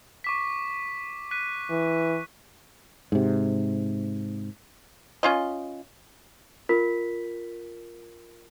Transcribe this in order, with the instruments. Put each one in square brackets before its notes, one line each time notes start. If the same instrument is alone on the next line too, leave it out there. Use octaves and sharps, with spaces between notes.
[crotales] C#6 D6 B6
F#6 B6 D#7
[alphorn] E3
[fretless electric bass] G#2 C3
[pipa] C#4 F4 D#5
[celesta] F4 A#4 B6